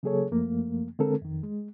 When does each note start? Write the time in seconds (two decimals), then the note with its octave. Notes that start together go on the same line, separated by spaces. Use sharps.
0.03 C#3 F#3 A#3 G#4 A4 C#5
0.31 F#2 F3 A3 A#3
0.99 D3 G#3 C4 A4 A#4
1.22 F2 D#3
1.43 G#3